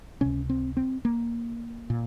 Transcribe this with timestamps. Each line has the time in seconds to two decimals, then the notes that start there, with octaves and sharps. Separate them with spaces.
0.21 C#2 C3 C#4
0.50 C4
0.77 C4
1.05 A#3
1.90 A#2